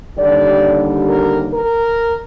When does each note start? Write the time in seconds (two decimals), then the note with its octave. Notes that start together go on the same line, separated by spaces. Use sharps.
0.18 D#2 D3 G3 D5
1.08 A#4
1.52 A#4